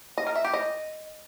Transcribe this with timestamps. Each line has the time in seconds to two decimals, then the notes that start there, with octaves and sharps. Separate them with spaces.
0.18 D#5
0.27 A#4
0.36 E5
0.45 G4
0.54 D#5